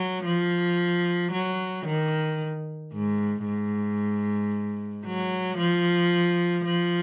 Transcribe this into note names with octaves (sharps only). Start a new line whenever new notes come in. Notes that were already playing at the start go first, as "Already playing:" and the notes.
Already playing: F#3
F3
F#3
D#3
G#2
G#2
F#3
F3
F3